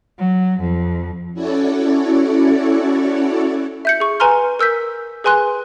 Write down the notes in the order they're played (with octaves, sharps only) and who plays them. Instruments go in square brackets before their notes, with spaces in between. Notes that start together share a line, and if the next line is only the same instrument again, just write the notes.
[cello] F#3
F2
[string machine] C#4 E4 F#4 A4 C#5 D5
[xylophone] E5 G6 C#7
G#4 C#6
B4 G#5 A#5 C6 F6
A#4 E6 G6 B6
G#4 B4 G#5 C6 F#6